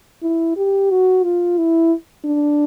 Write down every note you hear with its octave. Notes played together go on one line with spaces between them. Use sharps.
E4
G4
F#4
F4
E4
D4